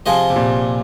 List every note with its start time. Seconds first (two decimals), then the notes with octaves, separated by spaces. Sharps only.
0.06 C3 F3 C4 F4 G#4 D#5
0.30 C3
0.36 A#2